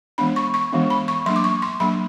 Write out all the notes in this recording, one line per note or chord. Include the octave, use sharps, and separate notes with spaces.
E3 G#3 B3 D4 B5
C#6
C#6
E3 G#3 B3 D4
B5
C#6
F#3 A#3 D4 C6
D6
C#6
C6
F#3 A#3 D4 B5